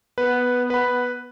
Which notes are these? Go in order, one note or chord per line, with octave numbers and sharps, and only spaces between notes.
B3 B4
B4 B5